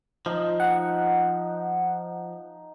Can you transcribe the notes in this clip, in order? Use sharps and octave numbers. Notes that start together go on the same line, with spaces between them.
F3 D#4 A5
F#5